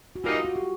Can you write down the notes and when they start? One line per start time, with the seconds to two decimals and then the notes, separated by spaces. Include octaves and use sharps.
0.16 F#4
0.24 E3 G3 A#3 D#4 F4
0.34 F#4
0.45 F#4
0.56 G4